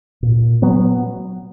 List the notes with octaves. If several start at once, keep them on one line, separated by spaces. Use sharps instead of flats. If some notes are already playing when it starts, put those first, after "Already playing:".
A#2
F#3 B3